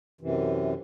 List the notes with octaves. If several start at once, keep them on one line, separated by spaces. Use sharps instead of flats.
F#2 C3 E3